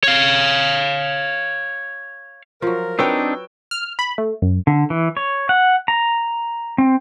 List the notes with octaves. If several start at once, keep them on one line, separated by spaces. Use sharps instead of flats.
C#5 F5
F3 F#3 A#4
C4 D4 D#4 F#4 B4 C#5 G5 E6
F6
B5
A3
F#2
D3
E3
C#5
F#5
A#5
C4